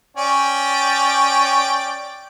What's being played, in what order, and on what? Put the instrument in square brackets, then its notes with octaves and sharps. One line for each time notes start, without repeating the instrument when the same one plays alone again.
[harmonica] C#4 D5 G5